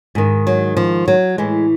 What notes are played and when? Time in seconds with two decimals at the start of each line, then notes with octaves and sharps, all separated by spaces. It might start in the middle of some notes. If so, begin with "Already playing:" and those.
0.15 G#2 D#3
0.47 F#3
0.77 F3
1.08 F#3
1.38 A2 E3 G#3